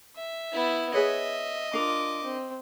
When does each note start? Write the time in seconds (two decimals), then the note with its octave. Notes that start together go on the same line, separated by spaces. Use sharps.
0.16 E5
0.53 B3 E4
0.94 G#4 B4 C#5 D#5 E5
1.73 D4 F4 A#4 D6
2.24 C4